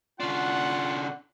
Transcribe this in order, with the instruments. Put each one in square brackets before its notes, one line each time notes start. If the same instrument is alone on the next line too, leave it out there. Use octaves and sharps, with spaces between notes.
[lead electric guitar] C#3 D4 [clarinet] F4 [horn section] F#5